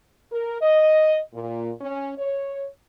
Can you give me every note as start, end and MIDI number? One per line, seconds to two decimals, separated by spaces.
0.31 0.57 70
0.61 1.19 75
1.34 1.71 46
1.81 2.12 61
2.18 2.67 73